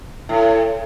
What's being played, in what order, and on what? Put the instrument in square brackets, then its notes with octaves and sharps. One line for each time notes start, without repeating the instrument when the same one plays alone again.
[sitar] A2